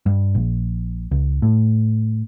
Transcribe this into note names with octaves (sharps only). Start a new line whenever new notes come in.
G2
A#1
C#2
A2